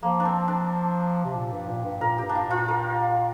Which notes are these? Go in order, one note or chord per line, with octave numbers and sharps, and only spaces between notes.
F3 A#3
D4
C4
D4
C3
A#2
G2
A#2
G2
A#2 A#4
G4
G2
D4
F4
A#2 F4
A#4